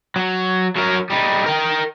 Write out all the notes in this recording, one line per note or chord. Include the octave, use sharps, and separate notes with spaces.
F#3
F#3 A#4
G3 D#4
A#4 G5